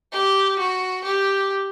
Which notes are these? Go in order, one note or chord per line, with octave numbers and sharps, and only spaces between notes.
G4
F#4
G4